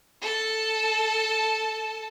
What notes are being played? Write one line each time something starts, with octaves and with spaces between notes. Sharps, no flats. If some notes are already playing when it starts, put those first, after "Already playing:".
A4 A5